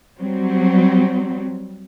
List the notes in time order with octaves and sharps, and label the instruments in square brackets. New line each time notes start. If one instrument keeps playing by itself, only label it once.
[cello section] F#3 G3 C4